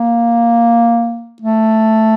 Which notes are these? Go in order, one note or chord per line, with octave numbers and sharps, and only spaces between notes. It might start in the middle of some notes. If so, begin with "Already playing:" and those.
Already playing: A#3
A3